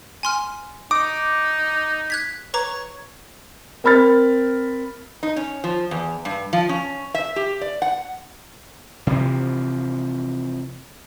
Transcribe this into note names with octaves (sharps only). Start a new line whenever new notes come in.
G#5 C6 F6
D#4 D6 D#6
F#6 G#6 B6
B4 C#5 A#5 D6
C4 A#4 B5 F6 A6
D#4
C#4
F3
E2
G2
F3
C#4
E5
G4
D5
F#5
C3 E3 F3